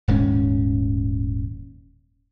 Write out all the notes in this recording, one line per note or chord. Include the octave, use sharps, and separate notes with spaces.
D#1 G#2 G3 C#4